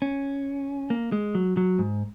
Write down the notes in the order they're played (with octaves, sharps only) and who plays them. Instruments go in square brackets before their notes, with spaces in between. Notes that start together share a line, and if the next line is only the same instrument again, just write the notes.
[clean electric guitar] C#4
A#3
G#3
F#3
F#3
G#2